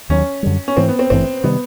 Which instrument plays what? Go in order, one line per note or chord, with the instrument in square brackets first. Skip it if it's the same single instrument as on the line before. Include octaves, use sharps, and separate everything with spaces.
[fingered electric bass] D#2 D#3 F#3 [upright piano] C#4
[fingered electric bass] F#2 D3 G3
[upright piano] C#4
[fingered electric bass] G#2 E3 A3 [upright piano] C4
[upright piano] B3
C4
[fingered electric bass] G#1 G2 E3 A3 [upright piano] C4
[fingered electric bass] C3 D#3 G3 [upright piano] B3